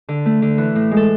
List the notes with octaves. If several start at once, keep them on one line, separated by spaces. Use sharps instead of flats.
D3
A3
D3
E3
A2
G#3
A4